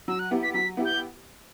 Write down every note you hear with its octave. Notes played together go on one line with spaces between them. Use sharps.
F#3 E6
F#6
B3 E4 G4
B6
F#3 B6
B3 E4 G4
G6